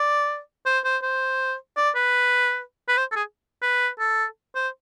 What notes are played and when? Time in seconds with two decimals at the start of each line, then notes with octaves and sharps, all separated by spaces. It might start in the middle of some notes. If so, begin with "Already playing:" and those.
Already playing: D5
0.66 C5
0.84 C5
1.03 C5
1.77 D5
1.95 B4
2.88 B4
2.97 C5
3.12 A4
3.16 G#4
3.62 B4
3.99 A4
4.55 C5